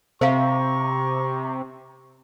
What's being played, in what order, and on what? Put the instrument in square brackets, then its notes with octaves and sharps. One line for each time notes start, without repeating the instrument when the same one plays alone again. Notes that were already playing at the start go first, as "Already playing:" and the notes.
[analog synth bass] C3 [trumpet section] G4 A#5 C#6 [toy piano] C5 E5 F5